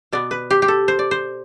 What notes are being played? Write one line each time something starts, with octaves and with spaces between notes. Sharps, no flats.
B2 B3 D5
B4
G4
G4
A4
C5
D5
C5